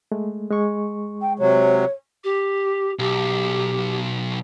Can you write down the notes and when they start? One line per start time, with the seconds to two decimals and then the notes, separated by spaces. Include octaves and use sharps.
0.12 G#3 A3
0.50 G#3 C#6
1.21 G5
1.39 C3 F#3 C#5
2.24 G4
2.99 B1 G4